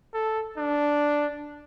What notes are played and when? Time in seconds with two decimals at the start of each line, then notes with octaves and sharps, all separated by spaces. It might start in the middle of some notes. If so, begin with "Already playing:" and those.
0.14 A4
0.57 D4